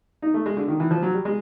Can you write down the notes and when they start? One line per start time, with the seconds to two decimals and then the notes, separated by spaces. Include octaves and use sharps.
0.22 D#4
0.34 A3
0.46 G#3
0.57 D3
0.68 D#3
0.80 E3
0.91 F3
1.02 F#3
1.14 G3
1.25 G#3